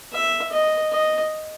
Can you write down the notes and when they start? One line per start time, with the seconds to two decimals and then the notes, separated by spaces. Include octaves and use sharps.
0.13 E5
0.52 D#5
0.92 D#5